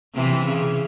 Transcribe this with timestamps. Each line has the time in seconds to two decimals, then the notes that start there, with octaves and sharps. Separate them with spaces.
0.14 C3 E3
0.45 C#3